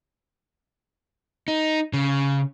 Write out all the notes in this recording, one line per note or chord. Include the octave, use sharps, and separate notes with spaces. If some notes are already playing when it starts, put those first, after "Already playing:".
D#4
C#3